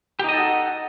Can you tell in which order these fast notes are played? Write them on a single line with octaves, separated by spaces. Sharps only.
G4 D#4 D#5 A4 F#4